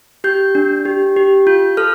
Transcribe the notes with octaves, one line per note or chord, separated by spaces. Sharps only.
G4 G6
D4
G4
G4
F4 G6
A4 F6